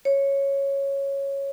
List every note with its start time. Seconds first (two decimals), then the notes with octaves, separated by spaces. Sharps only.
0.05 C#5